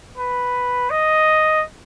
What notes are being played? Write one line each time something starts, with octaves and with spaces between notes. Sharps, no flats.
B4
D#5